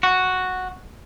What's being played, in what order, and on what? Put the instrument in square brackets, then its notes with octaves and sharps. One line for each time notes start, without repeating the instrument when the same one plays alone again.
[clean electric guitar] F#4